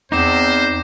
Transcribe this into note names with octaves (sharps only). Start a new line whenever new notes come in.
E2 C4 D#4 C5 D6 A#6 E7